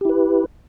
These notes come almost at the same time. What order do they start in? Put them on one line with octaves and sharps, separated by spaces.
G4 E4 B4